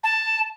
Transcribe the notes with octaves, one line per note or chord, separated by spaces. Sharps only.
A5